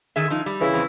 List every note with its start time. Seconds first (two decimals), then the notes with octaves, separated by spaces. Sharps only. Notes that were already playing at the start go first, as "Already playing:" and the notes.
0.16 D#3 G#4 E5
0.30 F3 D#4
0.46 G3
0.61 C#3 E3 E4
0.73 F2 C4